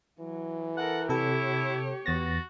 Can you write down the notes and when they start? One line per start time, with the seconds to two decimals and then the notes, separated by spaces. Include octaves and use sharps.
0.20 E3 F#3
0.77 A4 A#4 F#5
1.09 C3 E4 G4 A4 C#5
2.06 E2 B3 F#4 A6 A#6